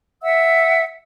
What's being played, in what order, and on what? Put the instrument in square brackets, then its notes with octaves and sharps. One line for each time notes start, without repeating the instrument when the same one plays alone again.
[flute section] E5 F#5 E6